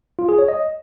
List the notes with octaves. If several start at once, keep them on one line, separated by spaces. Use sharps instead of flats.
F4
G#4
C#5
D#5